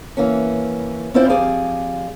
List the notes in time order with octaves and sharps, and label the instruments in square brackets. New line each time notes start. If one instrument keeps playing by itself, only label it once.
[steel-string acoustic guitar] E3 A#3 C#4
C4 C#4 E4 F4 C5 D5
F2 G#3 G4 G#4 D5 F5